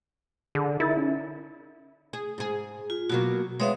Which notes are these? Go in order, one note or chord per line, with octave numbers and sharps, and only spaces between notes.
D3 G#4
D#4 E4 A#4 A6
C#4
G#4
G#2 G#4
F4
B2 F#3 A#3 F#4
G#3 B3 C#5 E5 F5